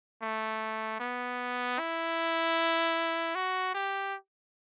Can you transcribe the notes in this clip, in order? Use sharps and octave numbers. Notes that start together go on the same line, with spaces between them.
A3
B3
E4
F#4
G4